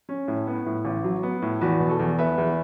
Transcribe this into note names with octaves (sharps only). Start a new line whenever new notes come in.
C#4
A2
B3
A2
A1
F#3
B3
A2
E2 F#4 B4
B2
A4
E2
B3 B4 E5
E2